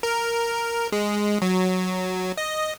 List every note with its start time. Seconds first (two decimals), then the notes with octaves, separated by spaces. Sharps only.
0.03 A#4
0.92 G#3
1.42 F#3
2.38 D#5